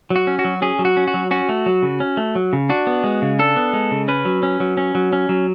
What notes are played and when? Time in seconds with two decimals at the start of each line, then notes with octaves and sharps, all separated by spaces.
0.10 F#3
0.16 F#4
0.27 C#4
0.39 F#4
0.45 F#3
0.62 C#4 G#4
0.79 F#3
0.85 F#4
0.97 C#4
1.08 F#4
1.14 F#3
1.31 C#4 F#4
1.49 A3
1.66 F#3
1.83 C#3
2.00 C#4
2.17 A3
2.35 F#3
2.53 C#3
2.69 D4 F#4
2.87 B3
3.04 G#3
3.22 C#3
3.39 D4 A4
3.56 B3
3.73 G#3
3.91 C#3
4.08 C#4 B4
4.25 F#3
4.43 C#4
4.60 F#3
4.77 C#4
4.95 F#3
5.13 C#4
5.29 F#3